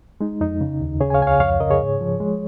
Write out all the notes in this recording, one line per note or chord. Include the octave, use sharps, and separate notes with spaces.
G#3 D#4
F2 D#4
C#3
D#2
C#3 G#4 C#5
G#5
C#5 F5
C#2 G#5
C#5 F5
F2 C#5 F5
C#3 A#4 D#5
G#4 C#5
G#2
F3
G#3